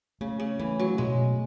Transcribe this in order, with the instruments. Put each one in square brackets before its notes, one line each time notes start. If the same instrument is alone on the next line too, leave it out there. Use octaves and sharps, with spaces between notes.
[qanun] C#3 [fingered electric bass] A3
[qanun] C#3
[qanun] E3 [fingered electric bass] A3
[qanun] F#3
[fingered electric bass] B2 [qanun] G#3